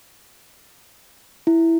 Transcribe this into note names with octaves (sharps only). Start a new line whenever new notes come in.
E4